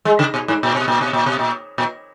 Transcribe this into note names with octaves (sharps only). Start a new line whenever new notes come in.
G#3
C#3
B2
G#2
A#2
B2
A#2
B2
A#2
B2
A#2
A#2